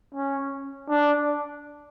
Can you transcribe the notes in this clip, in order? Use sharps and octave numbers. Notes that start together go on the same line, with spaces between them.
C#4
D4